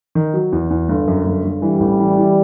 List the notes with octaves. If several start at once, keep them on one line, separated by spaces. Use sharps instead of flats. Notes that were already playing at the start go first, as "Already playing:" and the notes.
D#3
F#3
E2
E2
G1
F#2
G1
G1
E3 G3
A1
E3
E3